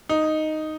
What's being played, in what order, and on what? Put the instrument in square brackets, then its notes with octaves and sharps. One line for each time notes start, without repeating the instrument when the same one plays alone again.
[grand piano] D#4